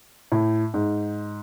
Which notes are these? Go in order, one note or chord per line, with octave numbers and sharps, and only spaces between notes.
A2
G#2